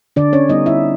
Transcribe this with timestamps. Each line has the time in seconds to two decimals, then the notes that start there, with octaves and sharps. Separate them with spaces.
0.16 D3 D4 D5
0.33 C#4 C#5
0.49 G3 B3 D#4 D#5
0.66 E4 E5